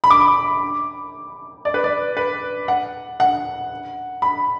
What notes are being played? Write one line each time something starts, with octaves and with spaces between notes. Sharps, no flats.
B5
D6
D5
B4
D5
B4
F#5
F#5
B5